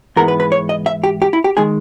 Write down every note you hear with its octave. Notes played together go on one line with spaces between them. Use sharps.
G#2 E3 G#3 B3 A#4
B4
B4
C#5
D#5
E5
G4
G4
E4
G4
D#3 G#3 G#4